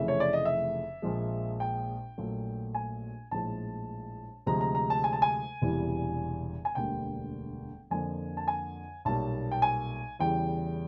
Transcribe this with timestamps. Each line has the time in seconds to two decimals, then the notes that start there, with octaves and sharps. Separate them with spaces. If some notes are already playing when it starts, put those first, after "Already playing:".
Already playing: F1 F2 C#3 E3 A3 E5
0.08 C#5
0.20 D5
0.33 D#5
0.45 E5
1.02 A#1 A#2 F3 G#3
1.60 G5
2.18 A#1 A#2 F#3 A3
2.75 G#5
3.31 A#1 A2 F3 G#3 A5
4.46 D2 C3 F3 G#3 A#5
4.61 A#5
4.75 A#5
4.90 A5
5.04 G#5
5.13 A5
5.22 G#5
5.62 E1 E2 C3 E3 G3
6.65 G#5
6.75 E1 D2 D3 G3 A#3 G5
7.91 F2 D3 F3 A#3 G#5
8.37 A5
8.48 G#5
9.05 B1 A#2 G3 A#3 A5
9.52 G5
9.62 G#5
10.19 E2 C#3 E3 G3 G5